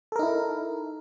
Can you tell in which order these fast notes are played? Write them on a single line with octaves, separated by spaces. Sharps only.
A4 A#4 D#4 E4